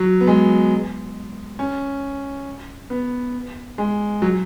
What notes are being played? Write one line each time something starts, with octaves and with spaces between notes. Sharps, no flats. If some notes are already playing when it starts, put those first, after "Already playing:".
Already playing: F#3
B3
G#3
C#4
B3
G#3
F#3